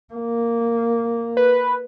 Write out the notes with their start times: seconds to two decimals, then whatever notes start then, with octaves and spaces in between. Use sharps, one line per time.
0.14 A#3
1.37 B4